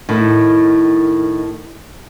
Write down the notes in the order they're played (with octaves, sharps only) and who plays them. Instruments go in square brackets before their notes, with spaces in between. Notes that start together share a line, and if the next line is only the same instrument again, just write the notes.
[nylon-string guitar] A2 D#3